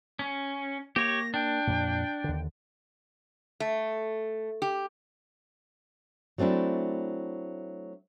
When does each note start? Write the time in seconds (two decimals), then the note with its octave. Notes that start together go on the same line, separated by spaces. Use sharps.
0.19 C#4
0.96 A#3 G4 C#5 A#6
1.34 D4 G5
1.67 F2 A#2
2.24 D#2 D3
3.60 A3
4.62 G4
6.38 F#3 A3 C4 D4 E4